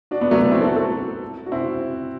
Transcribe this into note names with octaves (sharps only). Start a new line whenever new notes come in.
D4 F#4
B3 D4
F#3 A3
F#3 A3
C4 E4
F#4 A4
F#4 A4
F#4
C4 E4